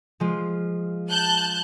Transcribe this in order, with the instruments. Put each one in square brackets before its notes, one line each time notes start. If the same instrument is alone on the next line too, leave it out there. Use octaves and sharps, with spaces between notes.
[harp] F3 G#3 F4
[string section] A5 F#6 G6